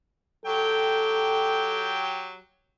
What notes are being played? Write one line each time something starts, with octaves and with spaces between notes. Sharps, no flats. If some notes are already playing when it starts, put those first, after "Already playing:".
F#3 G4 A4 G5